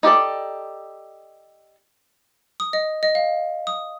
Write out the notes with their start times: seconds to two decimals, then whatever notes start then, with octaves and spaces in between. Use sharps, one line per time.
0.03 D#4 G4 A4 D5
2.60 D#6
2.73 D#5
3.03 D#5
3.15 F5
3.67 D#6